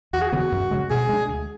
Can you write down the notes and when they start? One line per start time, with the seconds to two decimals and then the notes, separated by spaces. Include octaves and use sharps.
0.13 E2 F#4
0.22 G#4
0.29 C#3 E3 B3 F#4
0.52 F#2
0.71 C#3 G#3
0.90 B2 G#4
1.09 G#3 D4
1.28 D2